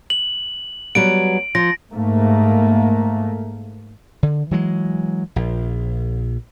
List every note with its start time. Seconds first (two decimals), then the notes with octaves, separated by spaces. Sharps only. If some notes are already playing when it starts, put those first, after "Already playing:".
0.10 F#7
0.95 F#3 G3 B3 D7
1.55 F3 A#6
1.91 G#2 A3 A#3
4.23 D3
4.51 E3 F#3 G#3
5.36 A#1